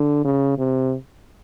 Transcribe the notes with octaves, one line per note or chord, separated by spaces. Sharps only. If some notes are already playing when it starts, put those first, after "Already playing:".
Already playing: D3
C#3
C3